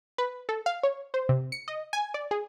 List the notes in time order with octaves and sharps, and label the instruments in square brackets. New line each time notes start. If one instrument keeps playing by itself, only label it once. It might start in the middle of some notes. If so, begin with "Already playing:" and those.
[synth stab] B4
A4
F5
C#5
C5
C3
C#7
D#5
G#5
D5
G#4